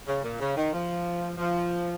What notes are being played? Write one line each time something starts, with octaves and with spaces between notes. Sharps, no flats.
C#3
A#2
C#3
D#3
F3
F3